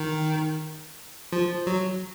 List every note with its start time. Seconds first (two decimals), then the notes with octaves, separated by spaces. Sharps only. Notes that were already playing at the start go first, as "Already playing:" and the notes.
Already playing: D#3
1.33 F3
1.67 F#3